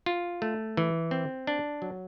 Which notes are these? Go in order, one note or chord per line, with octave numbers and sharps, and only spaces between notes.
F4
A3
E3
C4
D4
F#3